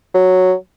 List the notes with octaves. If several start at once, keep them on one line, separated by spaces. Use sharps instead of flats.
F#3